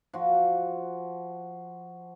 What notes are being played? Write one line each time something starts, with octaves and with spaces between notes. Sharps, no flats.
F3 F#4